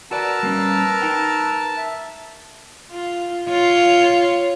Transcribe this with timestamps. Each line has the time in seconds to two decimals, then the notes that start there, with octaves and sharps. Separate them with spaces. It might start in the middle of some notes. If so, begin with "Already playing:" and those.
0.11 F#4 A#4 B4 D5 A5 A#5 E6
0.43 G3 A#3 C#4
1.02 D#4 G5
1.77 E5
2.91 F4
3.49 F4 C#5